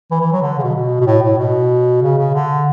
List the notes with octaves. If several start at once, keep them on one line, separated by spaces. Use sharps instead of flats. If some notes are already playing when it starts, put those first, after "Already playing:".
E3
E3
F#3
D3
C#3
B2
B2
B2
A2
A2
B2
C#3
C#3
D3